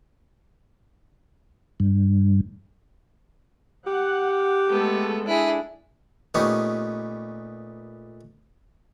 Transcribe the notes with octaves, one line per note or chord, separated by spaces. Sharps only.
G2
G4 F#5
G#3 A3 B3 A4
D4 E4 G#4
A#2 A3 B3 C#4 D#4 G4